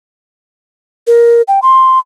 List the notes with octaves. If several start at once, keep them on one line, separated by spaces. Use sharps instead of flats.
A#4
G5
C6